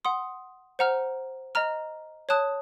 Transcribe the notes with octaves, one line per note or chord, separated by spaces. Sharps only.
F#5 C6 D#6
C5 F#5 A#5 F6
D#5 A#5 F6
C#5 A5 D#6 F#6